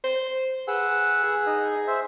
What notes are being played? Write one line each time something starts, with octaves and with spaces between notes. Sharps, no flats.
C5
G#4 B4 F#5 E6
G#4
D#4 D#5
C5 E5